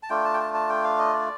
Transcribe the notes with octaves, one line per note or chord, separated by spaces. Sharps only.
A5
A3 D4 F4 G5
A5
G5
A5
A5
G5
F5
D#5
D5